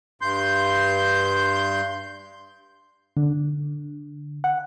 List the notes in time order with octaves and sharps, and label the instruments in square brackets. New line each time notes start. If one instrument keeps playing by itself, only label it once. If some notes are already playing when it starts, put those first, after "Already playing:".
[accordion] G2 C6 G6
[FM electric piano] D3
F#5